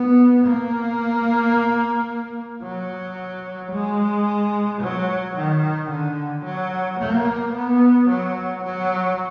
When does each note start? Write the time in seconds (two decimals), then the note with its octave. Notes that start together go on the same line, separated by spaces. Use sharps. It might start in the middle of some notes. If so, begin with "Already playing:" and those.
Already playing: B3
0.45 A#3
2.63 F#3
3.72 G#3
4.81 F#3
5.36 D#3
5.90 D3
6.45 F#3
7.00 A#3
7.54 B3
8.09 F#3
8.64 F#3